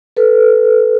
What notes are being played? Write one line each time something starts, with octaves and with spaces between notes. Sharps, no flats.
A4 B4